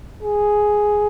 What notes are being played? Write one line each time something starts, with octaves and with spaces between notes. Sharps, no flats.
G#4